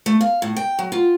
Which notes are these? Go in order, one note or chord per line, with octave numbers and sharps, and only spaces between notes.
A3
F5
A2
G5
F#3
F4